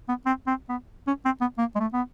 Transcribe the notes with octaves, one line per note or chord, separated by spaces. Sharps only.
B3
C4
C4
B3
C#4
C4
B3
A#3
G#3
A3
B3